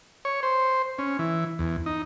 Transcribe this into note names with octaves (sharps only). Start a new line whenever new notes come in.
C#5
C5
C#4
E3
E2
D#4